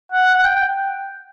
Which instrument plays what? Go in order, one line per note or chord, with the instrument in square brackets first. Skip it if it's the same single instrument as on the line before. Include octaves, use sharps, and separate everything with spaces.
[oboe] F#5
F#5
G5